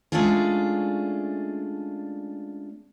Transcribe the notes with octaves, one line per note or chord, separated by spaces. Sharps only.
G#3 A3 C#4 D4 F4 G#4